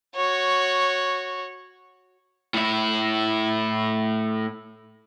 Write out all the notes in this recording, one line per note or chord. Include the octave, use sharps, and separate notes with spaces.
F#4 C#5
A2 E4